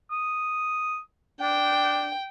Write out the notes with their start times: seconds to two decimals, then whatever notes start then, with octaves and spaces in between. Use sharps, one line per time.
0.11 D#6
1.41 D4 G5